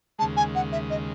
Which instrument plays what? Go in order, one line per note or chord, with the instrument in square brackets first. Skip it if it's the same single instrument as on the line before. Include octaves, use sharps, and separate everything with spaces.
[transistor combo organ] G#3 [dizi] A5
[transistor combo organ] D#2 C#3
[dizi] G#5
F#5
E5
D#5